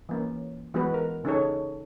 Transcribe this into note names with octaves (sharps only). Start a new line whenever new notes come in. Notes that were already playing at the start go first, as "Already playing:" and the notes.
E3 A#3 C#4
E3 G#3 B3 F#4 B4
A#4
C#3 C#4 D#4 G#4 A4 C#5